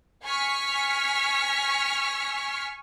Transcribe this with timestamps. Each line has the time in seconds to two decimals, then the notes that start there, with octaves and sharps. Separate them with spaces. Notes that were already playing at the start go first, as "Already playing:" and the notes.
0.24 G#5 C#6 F6 B6